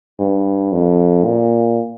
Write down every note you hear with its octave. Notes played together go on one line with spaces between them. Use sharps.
G2
F2
A#2